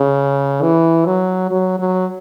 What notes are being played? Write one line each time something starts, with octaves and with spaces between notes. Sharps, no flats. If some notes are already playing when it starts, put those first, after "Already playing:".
Already playing: C#3
E3
F#3
F#3
F#3